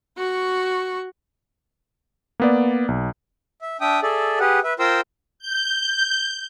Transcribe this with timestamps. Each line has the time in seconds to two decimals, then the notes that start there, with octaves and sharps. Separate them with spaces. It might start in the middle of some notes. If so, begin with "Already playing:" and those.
0.17 F#4 C#6
2.40 A#3 B3 D5
2.88 B1
3.61 E5
3.81 D4 E5 G5 D#6
4.02 G#4 A4 D5 E5
4.40 G4 G#4 B4 F#5
4.64 B4 E5
4.79 F4 A#4 C5 G5 C6 E6
5.39 G6